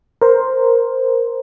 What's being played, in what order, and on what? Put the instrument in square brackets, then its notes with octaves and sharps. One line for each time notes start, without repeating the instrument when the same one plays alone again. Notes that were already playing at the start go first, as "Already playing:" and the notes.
[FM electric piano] A#4 C5